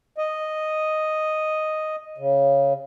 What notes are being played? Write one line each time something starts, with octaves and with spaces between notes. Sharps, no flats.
D#5
C#3